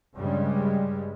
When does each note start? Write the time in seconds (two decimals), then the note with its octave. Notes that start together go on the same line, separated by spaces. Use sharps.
0.16 G2 C#3 G3 G#3